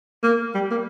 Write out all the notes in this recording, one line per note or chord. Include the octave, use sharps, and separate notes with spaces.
A#3
G3
A#3